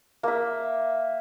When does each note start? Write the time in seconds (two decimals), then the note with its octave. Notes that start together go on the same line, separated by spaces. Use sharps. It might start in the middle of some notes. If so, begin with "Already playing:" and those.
0.23 A#3 E5